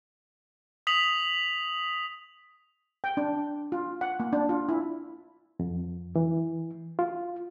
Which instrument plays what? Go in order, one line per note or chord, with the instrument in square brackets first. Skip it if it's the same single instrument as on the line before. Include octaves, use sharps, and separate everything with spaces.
[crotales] D#6 B6 F7 F#7
[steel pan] G5
D4
F4
F#5
A#3
D4
F4
E4
[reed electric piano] F2
E3
F4